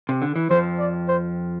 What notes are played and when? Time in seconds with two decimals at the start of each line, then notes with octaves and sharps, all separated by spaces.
0.09 C3
0.22 D3
0.36 E3
0.50 F2 F3 C5
0.79 D5
1.08 C5